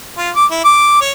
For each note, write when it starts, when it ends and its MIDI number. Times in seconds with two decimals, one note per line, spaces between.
0.17 0.31 65
0.36 0.45 86
0.51 0.60 64
0.64 0.99 86
1.01 1.11 73